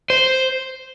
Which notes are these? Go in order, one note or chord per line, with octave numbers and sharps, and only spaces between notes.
C5